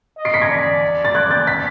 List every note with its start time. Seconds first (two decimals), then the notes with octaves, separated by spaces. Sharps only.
0.18 D#5
0.25 C7 D7
0.34 B6 C#7
0.41 G#6 A#6
0.49 D5
1.05 A6
1.15 F#6 G#6
1.31 G6 A6
1.47 A6 B6